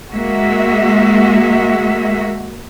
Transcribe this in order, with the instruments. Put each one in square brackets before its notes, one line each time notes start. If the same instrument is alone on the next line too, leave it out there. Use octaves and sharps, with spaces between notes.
[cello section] G#3 A#3 F#4 E5